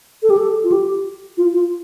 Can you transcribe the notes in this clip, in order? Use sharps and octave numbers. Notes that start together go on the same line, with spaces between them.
A4
G4
A4
F4
G4
F4
F4